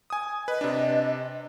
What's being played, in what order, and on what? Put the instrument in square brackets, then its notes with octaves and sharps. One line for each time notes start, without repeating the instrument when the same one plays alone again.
[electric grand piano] G#5 D#6
[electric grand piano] B4 [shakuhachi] D#5
[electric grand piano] C3 D4